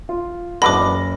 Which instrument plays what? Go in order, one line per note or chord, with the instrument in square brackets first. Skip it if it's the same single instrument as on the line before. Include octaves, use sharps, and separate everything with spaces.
[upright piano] F4
[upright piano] F#1 A#6 [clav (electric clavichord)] E2 B2 D3 [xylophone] B5 D6